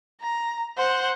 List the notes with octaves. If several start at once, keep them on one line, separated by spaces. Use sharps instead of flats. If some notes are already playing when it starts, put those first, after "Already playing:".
A#5
C5 F#5